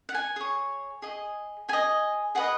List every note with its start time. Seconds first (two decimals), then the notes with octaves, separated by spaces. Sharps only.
0.09 F#5
0.15 G#5
0.36 G#4 C#5
1.02 G#4 D#5
1.69 G#4 D#5 G#5
2.35 G#4 B4 D#5 F#5